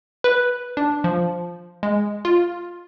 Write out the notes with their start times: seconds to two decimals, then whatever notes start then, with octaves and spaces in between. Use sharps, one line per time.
0.24 B4
0.77 D4
1.04 F3
1.83 G#3
2.25 F4